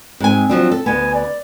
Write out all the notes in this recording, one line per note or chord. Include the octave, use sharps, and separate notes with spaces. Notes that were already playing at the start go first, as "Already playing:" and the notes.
G#2 C4 G#5
F3 F#3 D4
A4
D2 B3 G#5
D5